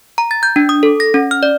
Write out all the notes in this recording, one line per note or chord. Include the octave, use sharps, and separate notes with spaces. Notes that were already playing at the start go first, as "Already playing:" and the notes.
A#5
A6
G6
D4
D#6
A4
A#6
C#4
F6
D5